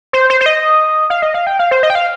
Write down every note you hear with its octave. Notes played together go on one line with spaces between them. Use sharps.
C5
C5
C5
D#5
F5
D#5
F5
G5
F5
C5
D#5
G5
F5